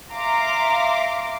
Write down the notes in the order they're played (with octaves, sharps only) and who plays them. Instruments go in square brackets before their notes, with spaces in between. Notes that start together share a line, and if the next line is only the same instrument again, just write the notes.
[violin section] E5 F5 A#5 C6 D6